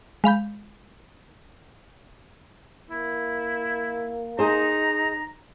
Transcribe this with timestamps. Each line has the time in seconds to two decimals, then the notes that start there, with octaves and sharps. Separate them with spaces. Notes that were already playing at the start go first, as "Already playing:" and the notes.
0.24 G#3 F5 B5 G6
2.90 A#3 E4
4.39 D#4 G#4 C5 A#5